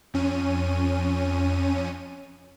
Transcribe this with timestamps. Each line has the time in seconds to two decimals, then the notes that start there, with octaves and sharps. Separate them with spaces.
0.14 F2 C#4 D#7